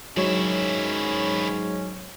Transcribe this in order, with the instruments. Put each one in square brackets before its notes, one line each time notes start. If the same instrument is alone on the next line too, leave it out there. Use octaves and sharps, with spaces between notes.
[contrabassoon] G#2 [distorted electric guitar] D#3 E4 [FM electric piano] F#3 C#5 [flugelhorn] C#4